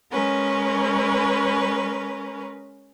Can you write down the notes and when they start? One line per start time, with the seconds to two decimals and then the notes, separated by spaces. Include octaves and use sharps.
0.10 G#3 C#4 A#4 B4